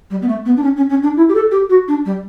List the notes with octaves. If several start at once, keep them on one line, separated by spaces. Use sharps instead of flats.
G3
B3
A3
B3
D4
C#4
C#4
C#4
D4
E4
G4
A4
G4
F#4
D4
G3